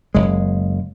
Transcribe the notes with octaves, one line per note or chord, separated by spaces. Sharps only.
F#1 G#3